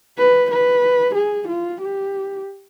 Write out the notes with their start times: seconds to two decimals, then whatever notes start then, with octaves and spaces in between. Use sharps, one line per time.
0.18 B4
0.51 B4
1.15 G#4
1.48 F4
1.81 G4